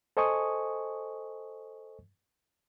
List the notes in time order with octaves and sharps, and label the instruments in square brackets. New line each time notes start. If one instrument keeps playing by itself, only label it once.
[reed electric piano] A4 C5 D#5 G#5 C#6 D#6